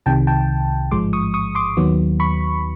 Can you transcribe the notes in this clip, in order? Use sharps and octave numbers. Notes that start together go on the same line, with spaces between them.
C2 C3 D#3 G5 A5
G5 A5
A1 G#2 F3 G#3 C6 D6
C#6 D#6
C#6 D#6
C6 D6
D#2 D#3 F#3 B3
B5 C#6